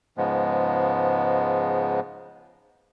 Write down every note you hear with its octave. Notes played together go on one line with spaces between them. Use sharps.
G#2 C#3 F3 G#3 B3